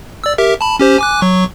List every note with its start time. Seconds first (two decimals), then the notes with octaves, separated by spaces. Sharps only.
0.24 D5 E6
0.38 G4 A#4 E5
0.61 A5 B5
0.80 C#4 G4 C5
0.98 G#5 D6 F#6
1.22 F#3 C#6